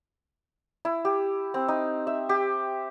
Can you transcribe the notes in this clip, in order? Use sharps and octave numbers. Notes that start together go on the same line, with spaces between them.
E4
G4
C4
D#4
E5
G4